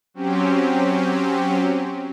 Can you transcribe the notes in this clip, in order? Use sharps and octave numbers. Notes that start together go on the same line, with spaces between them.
F#3 C4 C#4 G4